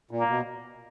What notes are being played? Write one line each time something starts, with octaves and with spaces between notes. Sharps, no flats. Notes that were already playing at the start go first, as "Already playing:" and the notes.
A#2
A#3
B2